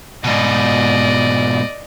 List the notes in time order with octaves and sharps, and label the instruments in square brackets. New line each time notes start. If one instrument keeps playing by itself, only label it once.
[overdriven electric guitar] G#2 B2 [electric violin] D5 D#5